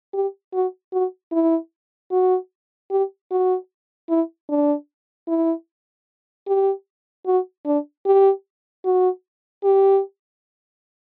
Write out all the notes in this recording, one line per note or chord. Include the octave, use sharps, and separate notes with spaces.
G4
F#4
F#4
E4
F#4
G4
F#4
E4
D4
E4
G4
F#4
D4
G4
F#4
G4